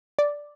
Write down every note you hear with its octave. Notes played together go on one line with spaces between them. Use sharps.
D5